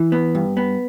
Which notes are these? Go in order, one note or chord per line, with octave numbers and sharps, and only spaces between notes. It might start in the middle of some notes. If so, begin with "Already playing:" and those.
Already playing: E3
B3
G2
B3